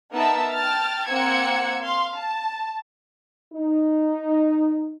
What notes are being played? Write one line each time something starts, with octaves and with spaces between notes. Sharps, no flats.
B3 D#4 A#4 E5 A5 E6
G5 A5 F6 A6
A#3 C4 F#5 E6 G#6 C#7
F5 C6
A5
D#4